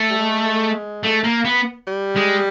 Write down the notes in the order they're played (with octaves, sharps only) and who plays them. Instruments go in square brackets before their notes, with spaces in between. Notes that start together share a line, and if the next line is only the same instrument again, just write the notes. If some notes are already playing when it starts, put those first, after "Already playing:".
Already playing: [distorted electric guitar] A3
[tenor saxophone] G3
G#3
[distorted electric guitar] A3
A#3
B3
[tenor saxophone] G3
[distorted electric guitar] G#3